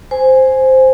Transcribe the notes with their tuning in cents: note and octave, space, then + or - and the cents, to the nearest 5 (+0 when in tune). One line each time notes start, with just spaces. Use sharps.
C5 +0 G#5 +0